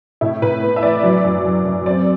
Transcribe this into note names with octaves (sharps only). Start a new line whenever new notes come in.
A2 E4
A2 B4
B3
E5
E3 D5
F#3
F#2
F#2
F#2
C4 D5